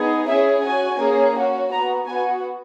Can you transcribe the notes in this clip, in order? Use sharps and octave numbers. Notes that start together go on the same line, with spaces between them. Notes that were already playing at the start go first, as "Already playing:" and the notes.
Already playing: B3 D#4 G#4
C#4 E4 G#4 E5
C#4 F#4 G#5
A#3 C#4 G#4
C#4 F#4
B3 F#4 A#5
B3 F#4 G#5